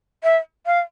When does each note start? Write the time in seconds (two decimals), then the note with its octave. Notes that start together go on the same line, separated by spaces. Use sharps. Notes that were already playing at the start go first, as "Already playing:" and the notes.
0.23 E5
0.66 F5